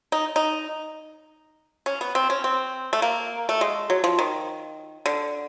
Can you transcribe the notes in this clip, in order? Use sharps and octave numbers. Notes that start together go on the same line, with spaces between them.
D#4
D#4
C#4
B3
C4
C#4
C4
A3
A#3
A3
G#3
F#3
F3
D#3
D3